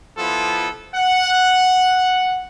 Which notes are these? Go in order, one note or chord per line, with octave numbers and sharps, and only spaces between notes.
F3 B3 E4 F4 A4
F#5